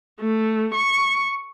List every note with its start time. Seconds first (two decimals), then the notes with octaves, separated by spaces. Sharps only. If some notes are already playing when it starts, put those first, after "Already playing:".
0.21 A3
0.74 C#6